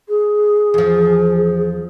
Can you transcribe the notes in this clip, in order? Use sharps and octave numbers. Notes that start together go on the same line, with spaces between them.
G#4
E2 F3